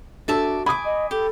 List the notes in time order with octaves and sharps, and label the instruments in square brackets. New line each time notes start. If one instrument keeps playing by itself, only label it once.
[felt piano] D4 A4 [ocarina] F#4 [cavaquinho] D5 E5 A5
[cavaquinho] G#5 D6 [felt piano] B5 D#6
[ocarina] D#5
[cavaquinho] G4 [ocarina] A4